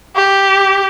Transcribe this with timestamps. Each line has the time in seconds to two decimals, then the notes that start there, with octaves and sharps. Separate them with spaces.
0.16 G4